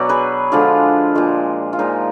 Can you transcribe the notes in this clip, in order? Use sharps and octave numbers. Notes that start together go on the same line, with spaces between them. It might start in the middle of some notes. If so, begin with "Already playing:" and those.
Already playing: B2 F#3 D5
G#4 B4
D3 F3 G#3 D4 F4
A#2 F3 G#3
F4
A#2 F3 G#3 D#4